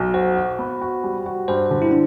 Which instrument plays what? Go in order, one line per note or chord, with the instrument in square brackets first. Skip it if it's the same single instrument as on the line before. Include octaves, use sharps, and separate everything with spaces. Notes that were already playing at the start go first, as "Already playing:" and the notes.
Already playing: [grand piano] B1
[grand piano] F#4 [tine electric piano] C5
[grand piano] F#4
B3
F#4
G3
F#4
[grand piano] G2 [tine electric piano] C5
[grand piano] D3
[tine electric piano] E4
D4